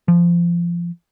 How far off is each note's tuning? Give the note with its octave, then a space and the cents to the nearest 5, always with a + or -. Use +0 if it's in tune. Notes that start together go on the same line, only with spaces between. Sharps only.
F3 -20